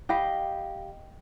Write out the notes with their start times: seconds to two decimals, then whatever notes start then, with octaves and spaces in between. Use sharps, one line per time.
0.09 G4 D#5 F5 B5